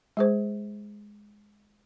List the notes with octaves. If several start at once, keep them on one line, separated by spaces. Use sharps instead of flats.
G#3 G#4 C5